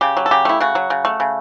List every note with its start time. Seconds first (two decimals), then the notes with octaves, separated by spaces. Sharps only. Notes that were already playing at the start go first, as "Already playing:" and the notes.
0.01 C#3 G4
0.17 F#3
0.26 A4
0.31 C#3 G4
0.45 A3 E4
0.60 C#3 F#4
0.75 F#3
0.90 C#3
1.05 A3
1.20 C#3